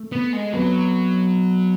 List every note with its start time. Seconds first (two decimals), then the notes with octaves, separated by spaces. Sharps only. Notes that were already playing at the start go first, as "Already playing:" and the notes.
Already playing: A3 A4
0.12 B3
0.33 G#3
0.53 F#3 B3 B4